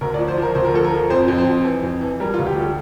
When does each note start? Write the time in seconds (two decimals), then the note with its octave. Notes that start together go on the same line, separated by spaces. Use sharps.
0.01 D2 A#4
0.14 D5
0.19 F3
0.28 C5
0.37 F3 A#4
0.55 D2 C5
0.65 A#4
0.74 F3 A4
0.85 A#4
0.92 F3
1.10 F2 C5
1.28 F2
1.38 C5
1.47 F2
1.65 E3
1.83 F2
2.01 E3
2.20 G3 A#4
2.34 F4
2.39 D2
2.47 G4
2.56 G3 A4